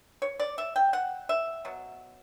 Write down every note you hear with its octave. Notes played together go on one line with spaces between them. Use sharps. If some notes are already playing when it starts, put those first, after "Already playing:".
C#5
D5
E5
G5
F#5
E5
B2 F#3